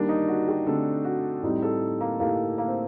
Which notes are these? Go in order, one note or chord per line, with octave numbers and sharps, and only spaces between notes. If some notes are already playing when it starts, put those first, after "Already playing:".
Already playing: D#3 G3 A#3 D4
D#4
F#4
G4
D3 A3 C4 A4
F#4
A2 G3 C4 D#4 G4
A4
A#3
A2 A3 A#3 D#4 G4 A#4
A#3
C4